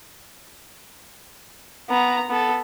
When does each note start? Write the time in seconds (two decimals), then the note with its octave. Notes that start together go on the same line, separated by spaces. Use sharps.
1.89 B3 A#5
2.30 B3 A4